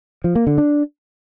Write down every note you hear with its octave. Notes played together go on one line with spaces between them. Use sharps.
F3
A#3
D3
D4